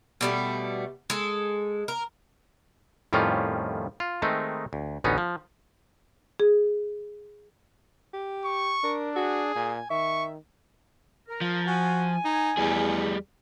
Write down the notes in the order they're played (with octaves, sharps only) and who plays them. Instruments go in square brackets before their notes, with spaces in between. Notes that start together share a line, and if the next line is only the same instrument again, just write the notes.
[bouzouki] B2 G3 A3
G#3 A4
A#4
[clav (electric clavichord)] F2 A2 D#3 G3 C#4 F4
F4
D#3 G#3 A3 C4 D#4
D2
A1 D2 B3 C#4 D#4
F3
[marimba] G#4
[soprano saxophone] G4
[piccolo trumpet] C#6
[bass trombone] D4 [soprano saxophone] A#4
[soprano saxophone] F#4 [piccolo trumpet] G#4
[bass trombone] A#2 [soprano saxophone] G#5
[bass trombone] D#3 [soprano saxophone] E5 [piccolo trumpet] C#6
[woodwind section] A#4
[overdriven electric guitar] F3
[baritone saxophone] F#4 [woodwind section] G#5
[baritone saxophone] D#4
[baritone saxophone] E2 [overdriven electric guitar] G3 G#4